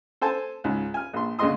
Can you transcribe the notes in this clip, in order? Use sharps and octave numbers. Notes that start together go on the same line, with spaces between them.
A4 C5 G#5 A5
C#2 G#2
G#5 F6
A#1 C6
D2 C#3 G#3 D#5 C6 D#6